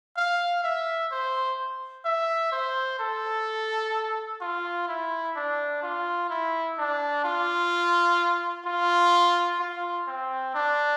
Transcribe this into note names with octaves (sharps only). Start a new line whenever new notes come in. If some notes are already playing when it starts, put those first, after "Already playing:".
F5
E5
C5
E5
C5
A4
F4
E4
D4
F4
E4
D4
F4
F4
F4
C4
D4